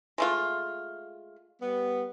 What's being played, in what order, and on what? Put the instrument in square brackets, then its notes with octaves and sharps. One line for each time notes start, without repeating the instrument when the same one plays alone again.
[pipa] G#3 A3 F4
[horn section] G3 B3